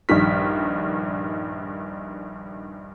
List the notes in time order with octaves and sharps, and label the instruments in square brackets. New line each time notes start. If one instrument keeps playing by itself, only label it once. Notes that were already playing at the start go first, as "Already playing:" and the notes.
[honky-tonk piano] A#1 G2 D#3 B6